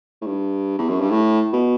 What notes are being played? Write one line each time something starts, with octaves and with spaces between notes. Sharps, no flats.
A2
G2
E2
F#2
G2
A2
B2